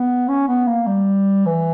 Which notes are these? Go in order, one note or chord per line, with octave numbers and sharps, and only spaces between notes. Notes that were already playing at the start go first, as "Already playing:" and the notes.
Already playing: B3
C#4
B3
A#3
G3
E3